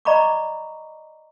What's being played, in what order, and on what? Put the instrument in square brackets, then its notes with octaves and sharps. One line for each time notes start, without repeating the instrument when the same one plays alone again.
[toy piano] D5 D#5 A#5 B5 C#6 D6